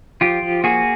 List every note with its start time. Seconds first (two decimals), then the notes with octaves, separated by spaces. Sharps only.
0.21 F3 F4 G4
0.43 F3
0.64 A#3 F#4 G#4